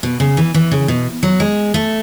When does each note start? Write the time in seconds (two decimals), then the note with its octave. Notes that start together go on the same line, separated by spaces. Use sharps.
0.03 B2
0.20 C#3
0.37 E3
0.54 E3
0.72 C#3
0.88 B2
1.23 F#3
1.40 G#3
1.74 A3